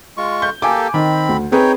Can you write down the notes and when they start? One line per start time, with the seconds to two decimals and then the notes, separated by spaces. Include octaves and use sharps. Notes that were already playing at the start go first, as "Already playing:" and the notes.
0.17 G#3 F4 C#6
0.42 G6
0.62 A#3 G4 A4 G#5 D6
0.94 D#3 C4 B5
1.29 D2
1.52 C4 D#4 G#4 B4 C#5 G5